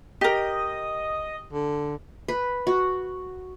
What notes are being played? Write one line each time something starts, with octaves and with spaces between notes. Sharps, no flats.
G4 A#4 D#5
D3
B4
F#4